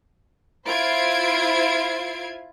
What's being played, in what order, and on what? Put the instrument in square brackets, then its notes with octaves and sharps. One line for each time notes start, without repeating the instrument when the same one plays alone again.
[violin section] E4 F4 C5 G#6 C7 D7